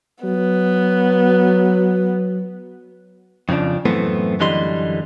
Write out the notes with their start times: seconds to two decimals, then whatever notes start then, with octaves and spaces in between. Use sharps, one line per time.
0.24 F#3 B3
3.49 F2 C#3 F3 D4
3.85 F#2 A2 E3 A3 B3 C4
4.40 F#2 D3 E3 G3 D#5 C6